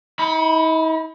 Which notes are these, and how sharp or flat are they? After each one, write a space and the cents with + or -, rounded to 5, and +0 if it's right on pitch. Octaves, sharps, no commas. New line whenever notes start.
D#4 +45 B5 +0